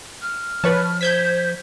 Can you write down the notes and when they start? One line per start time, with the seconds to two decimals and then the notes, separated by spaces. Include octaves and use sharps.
0.21 F6
0.64 F3 B4 C#5 A5
1.01 C5 G6 G#6 B6